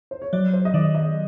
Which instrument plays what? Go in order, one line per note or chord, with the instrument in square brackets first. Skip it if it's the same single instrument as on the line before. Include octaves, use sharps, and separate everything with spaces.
[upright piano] C5
C#5
[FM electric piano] F#3 [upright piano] D5
[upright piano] C5
D#5
[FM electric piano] D#3 [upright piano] D5
[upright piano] D#5